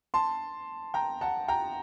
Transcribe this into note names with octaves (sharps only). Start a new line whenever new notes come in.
A5 C6
G5 A#5
F#5 A5
G5 A#5